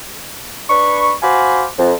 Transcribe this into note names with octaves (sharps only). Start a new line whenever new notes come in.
D4 B4 B5 C#6
F#4 C5 F5 G#5 B5 D6
F2